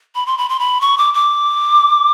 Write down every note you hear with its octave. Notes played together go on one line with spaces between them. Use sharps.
B5
C6
B5
C6
B5
C#6
D6
D6